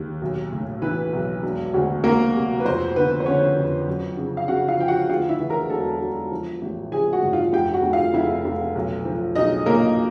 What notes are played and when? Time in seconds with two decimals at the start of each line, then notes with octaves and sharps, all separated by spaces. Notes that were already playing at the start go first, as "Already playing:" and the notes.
Already playing: D#2 D#3
0.22 B1
0.52 A2
0.82 E3 B3 B4
1.13 B1
1.43 E1
1.74 D2
2.04 D2 A#3 A#4
2.35 C3
2.60 B4
2.65 F2 C4 C5
2.96 D3 B3 B4
3.20 C5
3.26 D3 C#4 C#5
3.57 F2
3.87 F#2
4.17 C#3
4.37 F5
4.48 C#3 F#4 F#5
4.68 F4 F5
4.79 F3 G5
4.88 F#4 F#5
5.09 D2 F4 F5
5.29 E4 E5
5.40 E3
5.50 A#4 A#5
5.70 E1 A4 A5
6.01 E1
6.32 F3
6.62 A1
6.92 F3 G#4 G#5
7.13 F#4 F#5
7.23 G2
7.33 F4 F5
7.53 F1 G4 G5
7.74 F#4 F#5
7.83 F1
7.93 F4 F5
8.14 F1 E4 E5
8.45 F1
8.75 B1
9.05 F3
9.35 B1 D#4 D#5
9.66 A#2 A#3 A#4